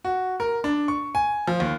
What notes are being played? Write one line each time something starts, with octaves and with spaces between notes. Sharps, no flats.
F#4
A#4
D4
C#6
G#5
F3
D#2